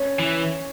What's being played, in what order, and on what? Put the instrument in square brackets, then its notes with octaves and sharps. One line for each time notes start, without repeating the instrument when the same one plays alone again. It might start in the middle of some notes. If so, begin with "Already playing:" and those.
Already playing: [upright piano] C#4
[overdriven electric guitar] E3